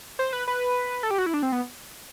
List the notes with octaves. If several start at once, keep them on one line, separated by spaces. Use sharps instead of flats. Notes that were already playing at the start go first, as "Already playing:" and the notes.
C5
B4
B4
A4
G4
F#4
E4
D4
C4
B3